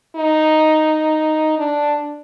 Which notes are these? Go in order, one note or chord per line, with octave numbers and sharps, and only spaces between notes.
D#4
D4